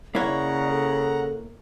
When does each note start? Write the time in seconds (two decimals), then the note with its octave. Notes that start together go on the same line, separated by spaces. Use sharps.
0.15 C#3 A#3 E4 C#5 D5 F#5 A#5
0.70 A4